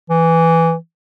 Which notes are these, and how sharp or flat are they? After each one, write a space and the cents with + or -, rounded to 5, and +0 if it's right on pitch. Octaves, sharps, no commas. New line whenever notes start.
E3 +5